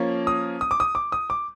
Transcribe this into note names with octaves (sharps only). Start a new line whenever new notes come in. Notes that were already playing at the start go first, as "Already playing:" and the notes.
Already playing: F3 A#3 C#4
D#6
D#6
D6
D#6
D6
D#6
D6